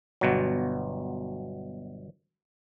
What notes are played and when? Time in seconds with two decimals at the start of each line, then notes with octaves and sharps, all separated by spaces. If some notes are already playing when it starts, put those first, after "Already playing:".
0.21 G1 B2 F#3